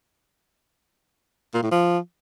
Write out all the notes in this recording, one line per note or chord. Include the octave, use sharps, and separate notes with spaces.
A#2
A2
F3